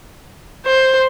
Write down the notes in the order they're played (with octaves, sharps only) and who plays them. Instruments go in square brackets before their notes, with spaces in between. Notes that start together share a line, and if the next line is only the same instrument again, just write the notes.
[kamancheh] C5